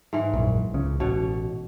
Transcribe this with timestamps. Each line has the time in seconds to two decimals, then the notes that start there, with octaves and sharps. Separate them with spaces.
0.13 G#2 E3
0.33 A#1 F#2
0.74 C#2 C#3
1.00 A1 B2 C#5